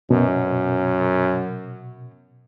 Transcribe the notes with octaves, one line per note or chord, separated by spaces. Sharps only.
F#2 B2